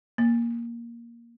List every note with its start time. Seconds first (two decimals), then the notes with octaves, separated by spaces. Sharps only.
0.18 A#3